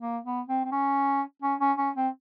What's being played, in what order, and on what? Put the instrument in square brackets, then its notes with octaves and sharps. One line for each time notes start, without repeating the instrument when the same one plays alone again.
[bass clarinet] A#3
B3
C4
C4
C#4
C#4
C#4
C#4
C4